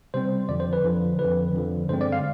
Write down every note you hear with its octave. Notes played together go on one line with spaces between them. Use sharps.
C3 G3 C4 C5
F2 D3 F3 D5
C5
B4
F2 D3 F3
F2 D3 F3 B4
F2 D3 F3
G2 D3 G#3 C4 C5
D5
F5